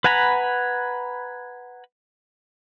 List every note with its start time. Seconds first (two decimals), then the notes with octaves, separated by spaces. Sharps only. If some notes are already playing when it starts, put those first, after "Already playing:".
0.04 B4 F#5 G#5 A#5 B5